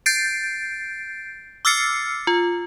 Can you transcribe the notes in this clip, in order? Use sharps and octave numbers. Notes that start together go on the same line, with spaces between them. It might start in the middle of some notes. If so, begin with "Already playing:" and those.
G6 A6 C7 D7
D6 E6 F6 A6 C7 C#7
F4